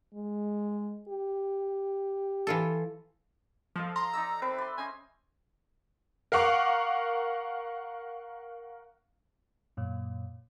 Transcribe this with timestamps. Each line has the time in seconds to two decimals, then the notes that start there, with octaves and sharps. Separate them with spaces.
0.14 G#3
1.09 G4
2.47 E3 F4 A4
3.76 F3 A4 D#5 F5
3.96 A#5 C6
4.13 D#4 D5 D#5 E6
4.42 C4 B4 E5
4.58 D5 C6
4.78 C#4 C5 D#5 G#5
6.32 A#4 F5 F#5 C#6 D6
9.77 F#2 A#2